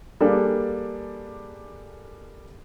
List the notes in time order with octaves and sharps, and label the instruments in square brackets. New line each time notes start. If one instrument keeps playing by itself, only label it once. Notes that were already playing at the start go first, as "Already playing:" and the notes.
[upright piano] G3 A#3 D4 G#4 A4